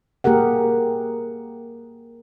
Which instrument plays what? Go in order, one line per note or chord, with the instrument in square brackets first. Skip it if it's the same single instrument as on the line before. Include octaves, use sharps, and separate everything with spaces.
[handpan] A#3 G4 G#4 A#4 F#5